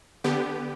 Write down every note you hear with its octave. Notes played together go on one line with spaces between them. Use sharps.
D3 B3 G4